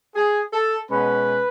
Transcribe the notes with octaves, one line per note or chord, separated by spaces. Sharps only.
G#4
A4
B2 G#3 C#4 B4